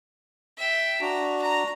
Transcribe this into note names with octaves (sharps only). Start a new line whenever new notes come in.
E5 G5
D4 F#4 A#5
A#5